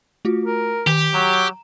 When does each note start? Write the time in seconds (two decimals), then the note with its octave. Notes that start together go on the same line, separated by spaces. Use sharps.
0.25 A3 F4 F#4
0.46 A#4
0.87 D#3 G4
1.14 F#3 A#5 E7